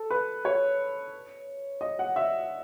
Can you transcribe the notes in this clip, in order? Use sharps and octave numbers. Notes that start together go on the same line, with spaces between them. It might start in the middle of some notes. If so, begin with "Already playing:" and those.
Already playing: A4
B4
C#5
D#5
F#5
E5